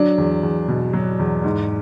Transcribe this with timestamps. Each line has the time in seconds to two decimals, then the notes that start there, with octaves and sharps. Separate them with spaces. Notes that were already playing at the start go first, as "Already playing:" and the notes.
Already playing: F#3 D4
0.18 E2
0.43 E2
0.68 B2
0.93 F#3
1.19 E2
1.44 G#2